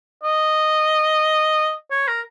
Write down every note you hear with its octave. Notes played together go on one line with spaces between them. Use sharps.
D#5
C#5
A#4